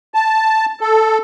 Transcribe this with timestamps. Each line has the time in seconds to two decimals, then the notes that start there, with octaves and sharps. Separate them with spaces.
0.14 A5
0.81 A4